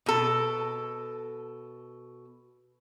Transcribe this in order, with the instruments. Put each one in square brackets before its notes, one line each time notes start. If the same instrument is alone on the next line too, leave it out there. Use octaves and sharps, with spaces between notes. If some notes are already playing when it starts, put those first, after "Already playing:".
[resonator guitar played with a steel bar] B2 A4